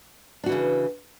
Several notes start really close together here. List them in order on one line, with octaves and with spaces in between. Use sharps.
D4 F#4 E3 C#3